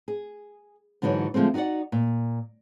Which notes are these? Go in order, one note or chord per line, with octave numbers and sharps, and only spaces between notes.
G#4
G#2 D3 E3 F#3 D#4 C#5
D3 F3 G#3 A3 C4
D#4 F#4 G4 D5 F#5
A#2